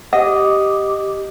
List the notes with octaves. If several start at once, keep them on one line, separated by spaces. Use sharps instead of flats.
G4 D#5 F#5